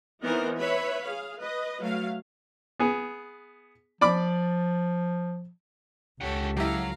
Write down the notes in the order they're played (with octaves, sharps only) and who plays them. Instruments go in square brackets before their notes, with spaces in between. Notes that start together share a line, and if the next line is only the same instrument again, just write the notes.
[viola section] E3 B3 C4 D#4 A#4 C5
B4 C#5 E5 B5
G#4 F5
B4 D#5
F#3 A3 F5
[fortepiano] B3 G#4
[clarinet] F3 [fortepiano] D5 B5 D6
[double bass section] C#2 [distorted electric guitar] G4 F#5 [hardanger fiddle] A4 C#5
[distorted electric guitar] F#3 [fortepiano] E4 G4 [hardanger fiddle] F5 A#5